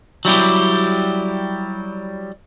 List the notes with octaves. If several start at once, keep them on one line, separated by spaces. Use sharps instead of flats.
F#3 G3 E4 G4